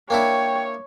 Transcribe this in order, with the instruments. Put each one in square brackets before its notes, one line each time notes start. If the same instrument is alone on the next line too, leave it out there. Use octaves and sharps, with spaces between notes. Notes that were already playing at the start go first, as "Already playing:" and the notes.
[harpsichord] A#3 D4 E4 [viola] C#5 [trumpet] G5